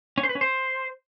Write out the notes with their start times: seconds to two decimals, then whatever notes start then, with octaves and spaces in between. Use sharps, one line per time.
0.18 C#4
0.23 C5
0.29 B4
0.35 C#4
0.41 C5